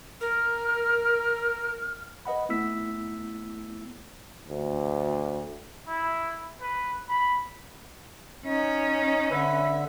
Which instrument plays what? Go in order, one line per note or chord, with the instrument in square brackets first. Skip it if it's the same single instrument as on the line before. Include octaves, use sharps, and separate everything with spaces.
[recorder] A#4 [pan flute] F6
[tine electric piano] B4 D#5 F#5 B5
A3 B3 E4 E6 B6
[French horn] D2
[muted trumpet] E4
B4
B5
[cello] C#4 [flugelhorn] D#4
[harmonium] D3 E5 [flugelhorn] B4